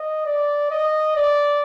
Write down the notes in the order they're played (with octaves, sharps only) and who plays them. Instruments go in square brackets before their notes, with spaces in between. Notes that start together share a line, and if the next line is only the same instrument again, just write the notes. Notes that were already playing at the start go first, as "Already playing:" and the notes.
Already playing: [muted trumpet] D#5
D5
D#5
D5